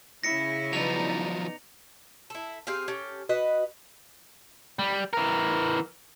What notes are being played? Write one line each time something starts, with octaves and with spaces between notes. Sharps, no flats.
C#3 E4 A#6 C#7
F3 F#3 B3 D#4 D5 F7
E4 A4
C4 G4 G#4 F5
C#4 G4 A4
F#4 B4 D#5
G3
E3 A#4